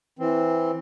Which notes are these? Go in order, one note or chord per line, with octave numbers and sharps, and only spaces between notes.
E3 C4